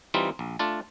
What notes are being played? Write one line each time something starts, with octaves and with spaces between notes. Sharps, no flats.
E3 G3 C4 D#4 F4
A#1
A3 D4 F4 A5